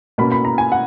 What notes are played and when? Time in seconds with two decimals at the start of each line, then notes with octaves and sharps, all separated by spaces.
0.18 B2 A#3 C#4 B5
0.32 B5
0.45 A#5
0.58 G#5
0.72 F#5